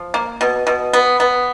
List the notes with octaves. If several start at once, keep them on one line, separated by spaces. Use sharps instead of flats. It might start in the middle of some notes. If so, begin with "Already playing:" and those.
Already playing: F3
A#3
B2
B2
B3
B3